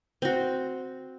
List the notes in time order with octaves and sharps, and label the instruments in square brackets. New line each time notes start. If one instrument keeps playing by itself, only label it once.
[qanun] C4 F#4